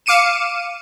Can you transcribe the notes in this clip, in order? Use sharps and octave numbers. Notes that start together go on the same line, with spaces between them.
F5 D6 C#7 D#7 E7